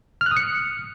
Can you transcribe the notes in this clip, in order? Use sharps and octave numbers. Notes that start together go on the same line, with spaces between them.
F6
F#6
D#6
C#7